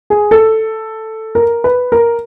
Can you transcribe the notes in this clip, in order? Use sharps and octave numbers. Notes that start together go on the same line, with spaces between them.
G#4
A4
A#4
B4
A#4